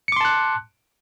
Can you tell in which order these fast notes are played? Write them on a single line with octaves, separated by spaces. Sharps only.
C#7 D6 C6 A5 F#6